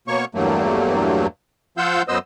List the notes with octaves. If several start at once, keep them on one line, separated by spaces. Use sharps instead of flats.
B2 A#3 C#5 C#6
E2 G2 F#3 A3 A#3
F3 F4 F5 F#5 E6 G6
F#2 B3 C5 D#5 E6